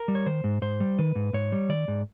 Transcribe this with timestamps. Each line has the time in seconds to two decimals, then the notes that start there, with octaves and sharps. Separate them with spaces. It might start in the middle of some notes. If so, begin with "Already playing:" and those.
Already playing: A#4
0.08 G3
0.15 C#5
0.26 D#3 C5
0.44 G#2
0.62 G#2 C5
0.80 G3
0.99 D#3 B4
1.15 G#2
1.33 G#2 C#5
1.52 G3
1.69 D#3 D5
1.88 G#2